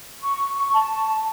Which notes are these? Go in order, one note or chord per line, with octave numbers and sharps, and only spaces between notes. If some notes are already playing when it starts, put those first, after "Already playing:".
C#6
A5